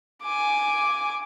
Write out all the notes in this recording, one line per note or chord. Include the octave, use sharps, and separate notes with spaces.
G#5 D6